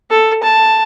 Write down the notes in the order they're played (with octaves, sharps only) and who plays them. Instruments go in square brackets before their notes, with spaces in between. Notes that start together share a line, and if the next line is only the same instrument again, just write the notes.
[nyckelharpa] A4
A5